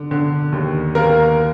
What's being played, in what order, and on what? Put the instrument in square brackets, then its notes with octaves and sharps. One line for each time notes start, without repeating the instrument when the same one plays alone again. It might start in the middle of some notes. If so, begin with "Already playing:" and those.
Already playing: [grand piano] D3
D3
D#2
D#2 A#3 A#4